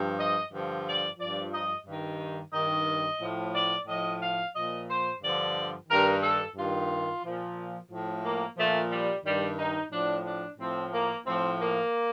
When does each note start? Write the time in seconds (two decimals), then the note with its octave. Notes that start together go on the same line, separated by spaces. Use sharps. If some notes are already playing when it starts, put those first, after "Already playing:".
Already playing: G2 F3
0.18 D#5
0.52 G2 D3 F3
0.85 D5
1.19 G2 F3 D5
1.52 D#5
1.86 G2 D#3
2.53 G2 D#3 D#5
3.20 A2 F3
3.54 D5
3.87 A2 F3 D#5
4.21 F5
4.54 A#2 F3 D#5
4.88 C5
5.21 G2 D3 F3 D5
5.89 G2 D#3 A#4
6.22 A4
6.55 G2 D#3 F4
7.23 A#2 F3
7.90 A2 F3
8.23 A#3
8.56 A#2 F3 A3
8.90 G3
9.24 G2 D#3 G3
9.58 D#4
9.91 A2 F3 D4
10.24 D4
10.57 A2 F3 C4
10.91 A#3
11.26 A2 F3 C4
11.59 A#3